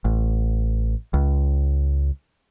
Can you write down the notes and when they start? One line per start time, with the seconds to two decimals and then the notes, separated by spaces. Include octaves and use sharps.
0.05 A1
1.14 C#2